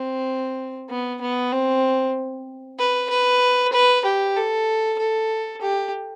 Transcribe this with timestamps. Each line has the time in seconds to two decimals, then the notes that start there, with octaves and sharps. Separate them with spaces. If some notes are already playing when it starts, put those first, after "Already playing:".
Already playing: C4
0.90 B3
1.21 B3
1.52 C4
2.79 B4
3.10 B4
3.72 B4
4.05 G4
4.36 A4
4.99 A4
5.62 G4